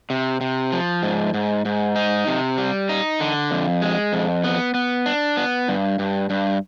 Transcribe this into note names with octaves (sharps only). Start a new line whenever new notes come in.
C3
C3
F3
G#2
G#2
G#2
D#4
C3
G3
D#4
D3
F2
G#3
F2
B3
B3
D4
B3
G2
G2
G2